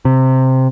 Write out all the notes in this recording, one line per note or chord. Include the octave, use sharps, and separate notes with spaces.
C3